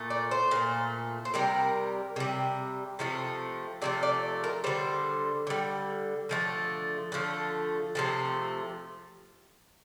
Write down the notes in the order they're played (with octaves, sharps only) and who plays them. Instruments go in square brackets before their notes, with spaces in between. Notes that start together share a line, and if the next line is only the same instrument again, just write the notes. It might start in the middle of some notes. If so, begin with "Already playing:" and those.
Already playing: [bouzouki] A#2 A3
D5
C5
A#2 A3
C5
C3 G3 A#4
C3 G3
C3 F3 A3
C3 F3 A3 D5
D5
A#4
D3 G3 C5
D3 G3
D3 F3 A3
D3 F3 A3
C3 F3 A3